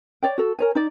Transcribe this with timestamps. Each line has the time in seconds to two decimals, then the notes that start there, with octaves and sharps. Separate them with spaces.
0.23 C#5 D5 G5
0.38 F#4 A4
0.59 A#4 C#5 G#5
0.75 D#4 D5